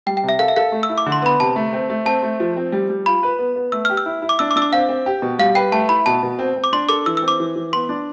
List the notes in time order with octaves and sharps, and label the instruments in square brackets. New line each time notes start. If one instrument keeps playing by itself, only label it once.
[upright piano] G3 [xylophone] G5
[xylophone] G5
[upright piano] C3
[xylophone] E5
[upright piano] A4 [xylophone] F5
[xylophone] E5
[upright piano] A4 [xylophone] F5
[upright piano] A3
[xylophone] E6
[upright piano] E4
[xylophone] D6
[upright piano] D3
[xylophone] C6
[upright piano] B3 [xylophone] B5
[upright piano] C3 [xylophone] A5
[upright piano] A3
C4
A3
[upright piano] C4 [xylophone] A5
[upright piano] A3
F3
C4
G3
G3
[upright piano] F4 [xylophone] B5
[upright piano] B4
B3
B3
[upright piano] A3 [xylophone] E6
[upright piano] G4 [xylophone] F6
[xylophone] E6
[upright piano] E4
E4
[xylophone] D6
[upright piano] D4 [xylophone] E6
[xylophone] D6
[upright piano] D4 [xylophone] E6
[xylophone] D6
[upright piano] C4 [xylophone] F5
[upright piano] C4
G4
B2
[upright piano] G3 [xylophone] F5
[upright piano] B4 [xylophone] G5
[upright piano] A3 [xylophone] A5
[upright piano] E4 [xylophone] B5
[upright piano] B2 [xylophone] A5
[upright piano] B2
C4
C4
[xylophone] D6
[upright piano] D4 [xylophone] C6
[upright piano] A4 [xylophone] D6
[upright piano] E3 [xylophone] E6
[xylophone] E6
[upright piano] C4
[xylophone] D6
[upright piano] E3
E3
[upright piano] B3 [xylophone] C6
[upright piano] D4